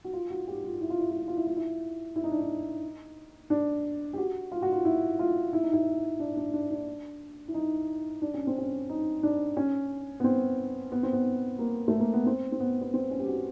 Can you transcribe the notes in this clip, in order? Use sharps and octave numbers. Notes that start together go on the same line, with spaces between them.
F#4
F4
F#4
G4
F4
E4
F4
E4
F4
E4
F4
E4
F4
E4
E4
D#4
D4
D#4
D4
G4
F#4
F4
F#4
F4
E4
F4
E4
D#4
E4
D4
D4
D4
D4
E4
D#4
D4
C#4
C4
C#4
D#4
D4
C#4
B3
C4
B3
C4
B3
A#3
A3
A#3
B3
C4
C4
B3
B3
C4
C#4
G4
F#4